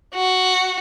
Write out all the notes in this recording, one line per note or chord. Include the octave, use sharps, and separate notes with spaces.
F#4